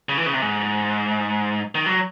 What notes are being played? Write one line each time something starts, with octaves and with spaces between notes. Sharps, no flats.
C#3
E3
C#3
C3
G#2
D#3
F#3